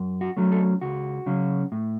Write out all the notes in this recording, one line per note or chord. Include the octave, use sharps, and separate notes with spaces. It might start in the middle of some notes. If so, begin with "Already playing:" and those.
Already playing: F#2
F#4
F#3 A3 C#4
A4
C#2 F#4
C#3 F#3 C#4
A2